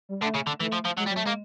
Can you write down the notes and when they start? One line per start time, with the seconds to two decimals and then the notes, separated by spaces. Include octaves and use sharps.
0.09 G3
0.22 D3 A3
0.34 C#3
0.47 D3
0.60 E3 A3
0.72 F3
0.85 F3
0.98 F#3 G#3
1.07 G3
1.11 F#3
1.17 A3
1.24 G#3
1.27 A#3